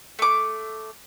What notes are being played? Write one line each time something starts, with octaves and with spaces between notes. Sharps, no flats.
A3 D6